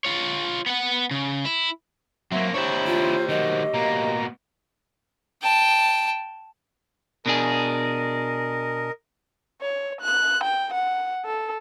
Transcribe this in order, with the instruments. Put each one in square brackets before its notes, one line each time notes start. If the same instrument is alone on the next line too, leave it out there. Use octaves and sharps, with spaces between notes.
[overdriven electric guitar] F4 C#5
B3 F#5
C#3
E4
[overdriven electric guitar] F#3 [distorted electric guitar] A#3 C4 [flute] E5
[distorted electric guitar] D4 E4 [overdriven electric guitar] G4 C#5 [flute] C5
[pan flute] F4
[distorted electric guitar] D#3 F#3 [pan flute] D#5
[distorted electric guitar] B2 A#3 [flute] A#5
[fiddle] G5 A5
[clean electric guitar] B2 D4 G#4 [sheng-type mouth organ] A#4 D#5
[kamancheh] C#5
F#6
G5
F#5
A4